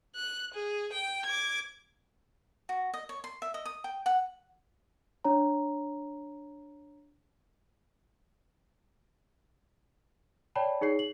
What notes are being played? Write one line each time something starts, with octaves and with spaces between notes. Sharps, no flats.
F#6
G#4
G5
D6 G#6
F#4
D#5
C#5
C6
E5
D#5
D#6
G5
F#5
D4 C#5 A#5
C#5 D5 G5 A5 B5
D#4 G#4 C#5 C7
F#7